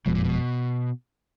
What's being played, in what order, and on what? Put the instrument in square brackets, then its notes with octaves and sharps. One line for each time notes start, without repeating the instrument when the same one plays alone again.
[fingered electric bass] F#1 F2 F3 G#3 [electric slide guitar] B2
[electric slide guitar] A#2
B2